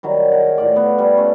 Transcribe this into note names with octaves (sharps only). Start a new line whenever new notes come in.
D#3 F#3 G3
G#4 A#4 F#5
A2 F4 D5
B3
G3
G3 A3 C#4